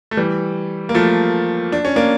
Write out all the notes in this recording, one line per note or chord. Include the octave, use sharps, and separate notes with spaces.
A3
E3 G3
A#3
F3 A3
D4
C#4
A#3 D4